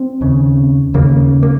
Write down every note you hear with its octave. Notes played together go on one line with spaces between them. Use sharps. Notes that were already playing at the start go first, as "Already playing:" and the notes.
Already playing: C4
D#2 C#3
D#2 C#3 A#3
A#3